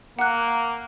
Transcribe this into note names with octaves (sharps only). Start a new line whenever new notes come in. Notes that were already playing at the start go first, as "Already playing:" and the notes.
A#3 F#5 F#6